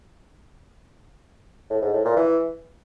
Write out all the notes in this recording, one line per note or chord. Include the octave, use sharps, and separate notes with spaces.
A2
G#2
A2
A#2
E3